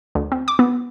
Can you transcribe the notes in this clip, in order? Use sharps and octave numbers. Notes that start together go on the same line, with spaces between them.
D2
C4
D6
B3